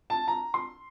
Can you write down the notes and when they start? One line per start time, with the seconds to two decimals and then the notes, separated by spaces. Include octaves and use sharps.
0.10 A5
0.28 A#5
0.54 C6